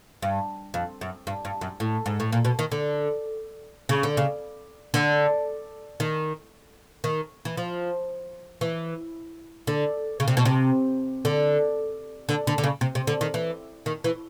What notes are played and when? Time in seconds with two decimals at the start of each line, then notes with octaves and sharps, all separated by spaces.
0.22 G2
0.74 F2
1.01 F#2
1.27 G2
1.45 G2
1.61 F#2
1.80 A2
2.06 G#2
2.20 A2
2.32 A#2
2.45 B2
2.59 D#3
2.72 D3
3.89 C#3
4.03 D3
4.17 C#3
4.94 D3
6.00 D#3
7.04 D#3
7.45 E3
7.57 F3
8.61 E3
9.67 D3
10.20 C#3
10.28 C3
10.37 B2
10.45 C3
11.25 D3
12.29 D3
12.47 D3
12.58 D3
12.64 C#3
12.81 C3
12.95 C3
13.07 D3
13.21 D#3
13.34 E3
13.86 D#3
14.04 E3